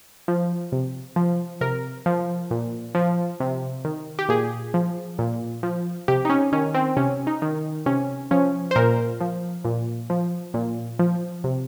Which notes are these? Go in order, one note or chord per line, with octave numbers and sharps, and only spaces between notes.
F3
C3
F3
C3 A#4
F3
A#2
F3
C3
D#3
G4
A#2 G#4
F3
A#2
F3
C3 G4
D#4
C#4
D#3 C#4
C4
C3 C#4
D#4
D#3
C3 C#4
F3 C#4
C5
A#2 A#4
F3
A#2
F3
A#2
F3
C3